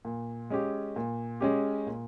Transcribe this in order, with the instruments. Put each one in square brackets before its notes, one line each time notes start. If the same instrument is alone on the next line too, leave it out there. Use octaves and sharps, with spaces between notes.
[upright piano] A#2
G#3 C#4 G4
A#2
G#3 C#4 G4
A#2